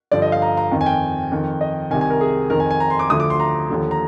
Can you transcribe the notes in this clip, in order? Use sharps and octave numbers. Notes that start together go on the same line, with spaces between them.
G2 D3 F3 D5
D#5
F5
A#5
A#5
F2 D#3
G#5
G5
F2 D#3
D#5
C2 C3 D#3 G#5
G#5
A#4
G#4
F2 D#3 A#4
G#5
G#5
A#5
C6
D6
D2 D3 F3 D#6
D6
C6
A#5
D#2 D3 F3
A#5